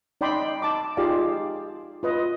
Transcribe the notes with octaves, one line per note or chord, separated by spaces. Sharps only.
D#4 D5 D#5 G5 B5 C6
A5 D6
D#4 F4 G4 G#4 D5 F5
F4 B4 D#5